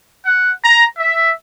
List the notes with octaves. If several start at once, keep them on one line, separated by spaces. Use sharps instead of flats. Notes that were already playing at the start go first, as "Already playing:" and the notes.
F#5
A#5
E5